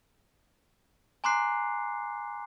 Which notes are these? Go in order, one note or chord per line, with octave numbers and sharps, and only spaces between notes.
G#5 A#5 C6 D6 F#6 C7